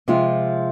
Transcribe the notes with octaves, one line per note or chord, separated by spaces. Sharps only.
C3 F3 G#3 F4